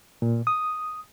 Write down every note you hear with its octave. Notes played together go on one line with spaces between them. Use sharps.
A#2
D#6